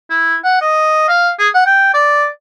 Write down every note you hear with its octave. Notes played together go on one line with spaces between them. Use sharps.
E4
F#5
D#5
F5
G#4
F#5
G5
D5